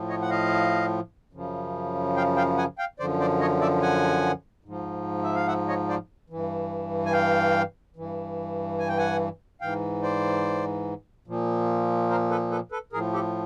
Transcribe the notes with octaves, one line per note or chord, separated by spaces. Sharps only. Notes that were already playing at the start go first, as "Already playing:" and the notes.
Already playing: A2 F3
C#5 D#5
F#5
D#5 F5
F#2 C#3 F3
F5 G5
F5 G5
F#5 G#5
F5 G5
F#2 D3 F3 C5 D5
C5 D5
C#5 D#5
D5 E5
F#5 G#5
G#2 F3
E5
F5
E5 F#5
C#5 D#5
C5 D5
G2 E3
G#5
F5 G5
G2 E3
G#5
G5
F#5 G#5
G#2 E3 F5 G5
C5 D5
A#2 F3
A#4 C5
A4 B4
A4 B4
A4 B4
A2 F3 G#4 A#4
G4 A4